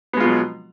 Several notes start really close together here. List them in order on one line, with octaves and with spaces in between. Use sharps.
B3 G#3 F4 B2 F#3